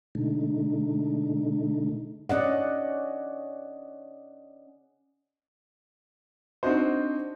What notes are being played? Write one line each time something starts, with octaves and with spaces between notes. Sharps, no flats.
B2 D3 G#3 A3 D4 D#4
C#4 D5 D#5 F#5
C4 D4 D#4 F#4 C5